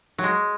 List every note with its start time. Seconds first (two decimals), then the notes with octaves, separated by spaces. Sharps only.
0.18 F#3
0.24 G#3